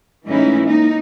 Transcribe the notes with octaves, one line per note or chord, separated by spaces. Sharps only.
G#2 E3 A3 C#4 D#4 E4
A#3 D#4